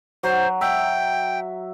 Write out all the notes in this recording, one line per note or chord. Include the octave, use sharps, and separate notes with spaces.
F#3 C5
E5 G5